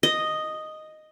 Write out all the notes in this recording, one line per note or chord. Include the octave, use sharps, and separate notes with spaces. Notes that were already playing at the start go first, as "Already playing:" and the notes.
D#5